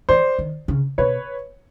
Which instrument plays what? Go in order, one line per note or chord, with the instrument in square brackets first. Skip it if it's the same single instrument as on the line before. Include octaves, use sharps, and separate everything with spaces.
[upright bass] E3 [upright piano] C5 D5
[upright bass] D#3
C#3
[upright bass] B2 [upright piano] B4 C#5